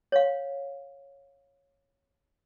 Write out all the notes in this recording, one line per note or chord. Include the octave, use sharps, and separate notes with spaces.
C#5 F5